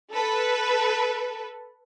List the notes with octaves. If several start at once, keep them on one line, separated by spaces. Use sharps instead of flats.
A4 B4